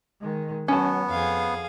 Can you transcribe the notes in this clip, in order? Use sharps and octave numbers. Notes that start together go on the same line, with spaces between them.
D#3 G#3
F#3 B3 C#4 A5
F2 G#4 F5